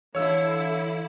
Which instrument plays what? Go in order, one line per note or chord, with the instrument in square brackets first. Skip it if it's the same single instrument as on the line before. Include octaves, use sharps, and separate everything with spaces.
[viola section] D3 E4 [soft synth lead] E3 [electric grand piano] C#5 E6 [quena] F5